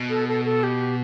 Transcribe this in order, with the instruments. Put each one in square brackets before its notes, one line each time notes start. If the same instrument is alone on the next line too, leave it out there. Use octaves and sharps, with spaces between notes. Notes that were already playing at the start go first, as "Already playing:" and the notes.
Already playing: [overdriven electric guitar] B2
[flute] A4
A4
A4
G4